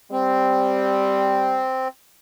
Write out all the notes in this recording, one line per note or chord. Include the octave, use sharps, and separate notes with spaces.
G3 C4